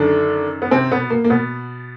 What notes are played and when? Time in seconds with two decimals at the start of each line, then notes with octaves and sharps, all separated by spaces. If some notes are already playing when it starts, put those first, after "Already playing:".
Already playing: F#2 D3 D#3 F#3 D4
0.62 B3
0.71 C3 C4
0.91 B2 B3
1.10 A#3
1.24 A#3
1.30 B2 B3